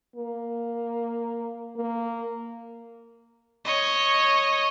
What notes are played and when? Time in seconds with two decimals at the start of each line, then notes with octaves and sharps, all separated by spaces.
0.16 A#3
1.77 A#3
3.65 C#5 D#5